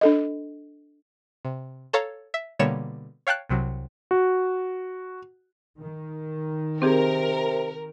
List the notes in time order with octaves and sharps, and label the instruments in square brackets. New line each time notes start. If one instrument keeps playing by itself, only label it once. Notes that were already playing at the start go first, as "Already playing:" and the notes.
[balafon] D4 A4 D#5
[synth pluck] C3
A4 C#5 F5 A#5
E5
B2 D3 G3 A#3 C#5 E7
C#5 F5 G5 A5 F#6
C2 C3 F#3
[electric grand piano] F#4
[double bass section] D#3
[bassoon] C3 [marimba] C4 G4 G#4 [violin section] A#4